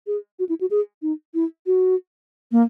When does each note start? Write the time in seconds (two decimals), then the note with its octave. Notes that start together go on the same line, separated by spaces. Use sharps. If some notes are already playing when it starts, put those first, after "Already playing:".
0.07 G#4
0.39 F#4
0.49 E4
0.61 F#4
0.71 G#4
1.02 D#4
1.34 E4
1.66 F#4
2.52 A#3